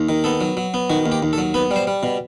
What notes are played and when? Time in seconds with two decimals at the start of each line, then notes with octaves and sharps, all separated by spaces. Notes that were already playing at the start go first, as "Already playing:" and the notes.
Already playing: D#2
0.09 D#3
0.24 B3 A4
0.41 F#3
0.57 F#3
0.74 B3
0.90 D#3 F#4
1.06 D#2
1.12 G4
1.23 D#2
1.33 A4
1.38 F#3
1.54 B3 B4
1.71 G3
1.76 C5
1.87 G3
2.03 B2